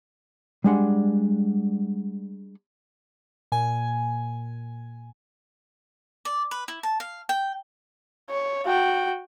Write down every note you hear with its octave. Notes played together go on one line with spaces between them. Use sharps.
G3 G#3 D4 F#5
A#2 G#5
D5
B4
E4
A5
F5
G5
C#5
F#4 G5